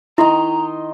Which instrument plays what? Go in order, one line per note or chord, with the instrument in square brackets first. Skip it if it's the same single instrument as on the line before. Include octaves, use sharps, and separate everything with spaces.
[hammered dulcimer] D#3 D#5 C6 [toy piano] E4 [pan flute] A#5